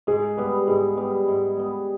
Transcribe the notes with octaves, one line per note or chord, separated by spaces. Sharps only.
G#2 G#4
G3 B3 B4
G#2 G#4
G3 B3
G#2
G3 B3